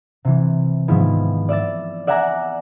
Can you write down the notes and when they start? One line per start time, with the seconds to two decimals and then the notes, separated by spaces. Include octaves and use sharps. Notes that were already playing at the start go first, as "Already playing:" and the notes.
0.25 C3 E3
0.88 G#2 D#3 F3 B3 E4
1.49 D5 E5 E6 A6
2.07 D5 E5 F#5 G#5 A#5 E6